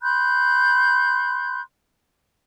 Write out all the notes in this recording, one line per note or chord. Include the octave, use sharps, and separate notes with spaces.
B5 C6 F#6 G6